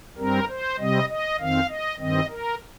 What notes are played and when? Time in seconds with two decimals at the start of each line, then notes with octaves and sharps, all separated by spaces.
0.18 G2 G3 C4 A#4
0.49 C5
0.78 C3 G3 C4 D#5
1.09 D#5
1.39 F2 D#3 C4 F5
1.69 D#5
1.99 G2 D#3 C4 D#5
2.29 A#4